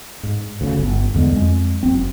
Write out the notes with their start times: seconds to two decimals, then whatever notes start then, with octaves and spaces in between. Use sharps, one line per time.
0.23 G#2
0.61 D2 C#3
0.79 G1
1.14 E2 D3 G#3
1.33 F2 G#3
1.83 F#1 C4